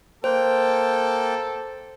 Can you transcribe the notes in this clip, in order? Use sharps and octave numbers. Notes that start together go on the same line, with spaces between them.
A#3 A4 C5 G5